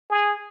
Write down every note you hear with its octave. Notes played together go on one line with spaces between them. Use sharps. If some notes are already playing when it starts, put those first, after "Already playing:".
G#4